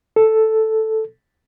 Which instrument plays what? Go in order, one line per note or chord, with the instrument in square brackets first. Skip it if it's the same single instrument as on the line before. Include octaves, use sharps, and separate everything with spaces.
[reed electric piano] A4